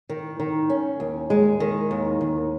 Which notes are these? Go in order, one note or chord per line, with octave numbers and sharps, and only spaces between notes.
D#3
D#3
C#4
D#2
G#3
D#3
D#2
D#2